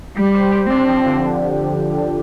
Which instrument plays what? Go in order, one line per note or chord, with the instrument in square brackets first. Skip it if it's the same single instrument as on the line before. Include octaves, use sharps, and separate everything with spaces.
[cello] G3 [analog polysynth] G4
[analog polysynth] C5
G4
[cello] C4 [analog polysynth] D4
[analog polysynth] F3
D3